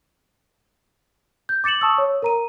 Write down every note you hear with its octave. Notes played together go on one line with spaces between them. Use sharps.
G6
D6 A6 C#7 E7 F#7
A5 C#6 D#6 E6
C#5
A#4 A#5 D#7